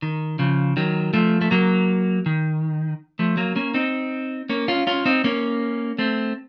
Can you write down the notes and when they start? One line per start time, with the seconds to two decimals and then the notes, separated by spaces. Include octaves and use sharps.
0.02 D#3
0.39 C#3 F3
0.77 D#3 F#3
1.13 F3 A3
1.41 A3
1.51 F#3 A#3
2.26 D#3
3.19 F3 A3
3.37 F#3 A#3
3.56 A#3 C#4
3.74 C4 D#4
4.49 A#3 C#4
4.68 C#4 F4
4.87 C#4 F4
5.06 C4 D#4
5.24 A#3 C#4
5.99 A3 C4